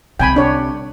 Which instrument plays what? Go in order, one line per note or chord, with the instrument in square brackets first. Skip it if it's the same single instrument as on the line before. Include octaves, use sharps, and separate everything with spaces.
[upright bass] C2 C3 [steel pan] G5 G#5 B5
[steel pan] D4 C#5